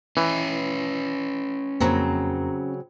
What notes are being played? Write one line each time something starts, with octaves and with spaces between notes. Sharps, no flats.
E3 C#4 B4
F2 C#3 F#3 A#3 C4 A#5